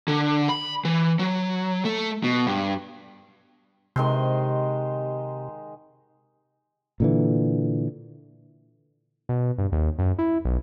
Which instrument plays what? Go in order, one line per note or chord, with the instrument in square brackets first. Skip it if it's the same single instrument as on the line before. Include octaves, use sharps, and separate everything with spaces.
[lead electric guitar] D3
B5
E3
F#3
A3
B2
G2
[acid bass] C3 [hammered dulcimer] D#3 G#3 C6
[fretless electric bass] A#2 D3 E3
[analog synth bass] B2
G2
D#2
F#2
E4
B1